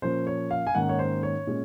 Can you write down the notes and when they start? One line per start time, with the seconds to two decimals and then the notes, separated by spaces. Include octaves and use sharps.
0.02 A#2 F3 A#3 C#4 C5
0.27 C#5
0.51 F5
0.67 G#5
0.75 G#2 D#3 A#3 C#4 F#5
0.89 C#5
0.99 C5
1.23 C#5
1.47 A#2 G#3 C#4